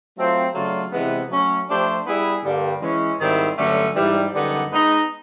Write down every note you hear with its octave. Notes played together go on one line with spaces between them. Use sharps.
F#3 A3 C4 F4
C#3 F#3 A3 D4 F4
C3 E3 G#3 B3
F#3 A3 C#4
F3 A3 D4 G4 C5
G3 B3 E4 G#4
G2 D3 G3 A#3 D4
E3 G#3 C#4
G#2 D#3 G3 C4 E4
G2 D3 F#3 A3 C#4
G#2 E3 G3
F#2 D3 G3 B3 D#4
G#3 B3 D#4